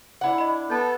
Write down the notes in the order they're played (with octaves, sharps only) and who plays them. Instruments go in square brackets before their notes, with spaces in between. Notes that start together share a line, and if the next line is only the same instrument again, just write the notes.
[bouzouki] D4 E4 F#5
[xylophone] D#5 B5
[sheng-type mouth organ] B3 A4 [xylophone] A5 G6